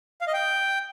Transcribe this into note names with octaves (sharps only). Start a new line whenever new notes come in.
F5
D#5
G5